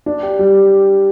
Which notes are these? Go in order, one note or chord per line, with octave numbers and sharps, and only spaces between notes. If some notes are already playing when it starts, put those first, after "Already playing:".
D4
G4
G3